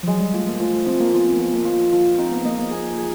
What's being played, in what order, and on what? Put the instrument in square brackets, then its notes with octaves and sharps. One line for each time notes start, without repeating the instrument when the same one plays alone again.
[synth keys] F3
[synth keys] F#3 [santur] G#3
[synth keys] G3
[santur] F3 [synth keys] A3
[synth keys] A#3
[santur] F3 [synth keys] A3
[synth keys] A3
[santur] F3 [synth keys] C4
[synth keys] A#3
[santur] F3 [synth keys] B3
[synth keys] C4
A#3
[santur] F3 [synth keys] B3
[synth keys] A#3
[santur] F3
F3
[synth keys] C4 [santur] D#4
[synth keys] B3
[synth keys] A#3 [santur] D#5
[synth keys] A#3
[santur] G#4
G#4